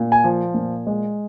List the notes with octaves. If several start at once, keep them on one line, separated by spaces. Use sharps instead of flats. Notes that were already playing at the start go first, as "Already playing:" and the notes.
Already playing: A#2
G#5
F3
A#2
G#3